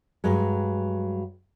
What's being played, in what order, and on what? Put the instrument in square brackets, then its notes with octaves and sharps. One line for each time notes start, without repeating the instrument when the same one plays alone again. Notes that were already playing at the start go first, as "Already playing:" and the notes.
[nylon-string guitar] G2 F#3 G#3